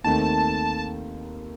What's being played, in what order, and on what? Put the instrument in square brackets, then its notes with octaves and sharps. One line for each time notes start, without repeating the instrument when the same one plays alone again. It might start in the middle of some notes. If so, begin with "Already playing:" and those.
[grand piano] D#2 D#3 A3 C4 [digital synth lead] A5